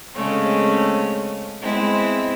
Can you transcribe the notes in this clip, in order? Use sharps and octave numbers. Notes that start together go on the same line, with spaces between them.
C#3 G#3 A3 C4 C#4
G#3 B3 C4 E4